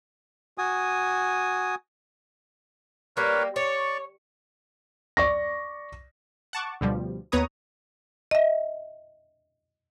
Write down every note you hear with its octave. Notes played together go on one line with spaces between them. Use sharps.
F#4 G#5 D#6
G3 A#3 A#4 B4 C#5
C#5 D5 C#6
D5 C#6 A#6
F#5 A5 C#6 D6
D2 B2 F3 G3
D#2 B3 B4 C#5 A#5 D#6
D#5 E5